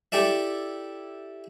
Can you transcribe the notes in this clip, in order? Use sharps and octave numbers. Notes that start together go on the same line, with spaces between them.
E4 G4 A4 D5 E5